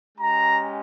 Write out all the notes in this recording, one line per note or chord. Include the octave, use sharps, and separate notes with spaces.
G#3 C#4 G4 A#5